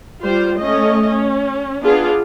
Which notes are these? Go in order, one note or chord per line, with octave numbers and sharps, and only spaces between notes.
G3 F4 C5
A3 C#4 D#5
C#4
B3 D4 F4 G#4